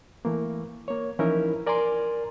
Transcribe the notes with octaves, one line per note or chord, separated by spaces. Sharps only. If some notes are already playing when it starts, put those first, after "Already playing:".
E3 A3 A#3
A#3 C#5
E3 F3 C#4 D#4 E4 A#4
A#4 D5 G#5 A#5 C6